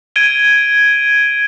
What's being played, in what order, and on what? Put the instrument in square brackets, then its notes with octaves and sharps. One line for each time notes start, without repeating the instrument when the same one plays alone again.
[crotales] G#6 D7 D#7 G7